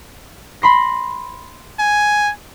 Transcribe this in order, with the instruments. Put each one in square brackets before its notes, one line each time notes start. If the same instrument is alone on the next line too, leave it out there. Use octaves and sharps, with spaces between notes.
[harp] B5 C6 A#6
[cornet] G#5